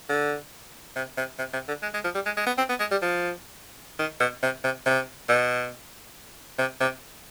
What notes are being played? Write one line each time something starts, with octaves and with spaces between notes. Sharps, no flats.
D3
C3
C3
C3
C3
D3
G#3
G#3
F3
G3
G#3
G#3
B3
C4
B3
G#3
G3
F3
D#3
B2
C3
C3
C3
B2
C3
C3